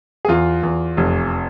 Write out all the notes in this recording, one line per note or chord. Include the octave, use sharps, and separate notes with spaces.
G#4
E2 F4
E2
F1